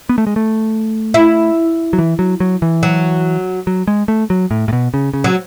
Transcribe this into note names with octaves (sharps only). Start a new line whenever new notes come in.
B3
A3
G#3
A3
E4
F#3
E3
F#3
F#3
E3
F#3
F#3
G#3
A3
F#3
A2
A2
B2
C#3
C#3
F#3